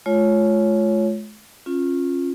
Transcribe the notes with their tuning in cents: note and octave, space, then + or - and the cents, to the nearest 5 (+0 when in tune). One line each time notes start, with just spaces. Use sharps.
G#3 +45 F4 +0 C#5 +0
C#4 -25 F4 +0